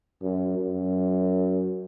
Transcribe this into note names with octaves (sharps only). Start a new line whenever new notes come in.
F#2
F#2